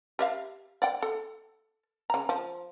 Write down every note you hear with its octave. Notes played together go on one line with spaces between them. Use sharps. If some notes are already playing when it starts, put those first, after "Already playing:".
G4 E5 F5
D5 F#5 G5
A4
C#3 A#5
F3